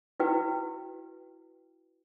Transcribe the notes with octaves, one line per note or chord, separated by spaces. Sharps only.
E4 F#4 B4 G5